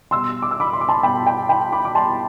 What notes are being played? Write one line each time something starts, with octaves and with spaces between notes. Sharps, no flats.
B2 G3 C6 E6
D6
E6
B5 D6
C6
D6
A5 C6
B2 G3 G5 B5
G5 B5
G5 B5
B5 D6
D6
B2 G3 A5 C6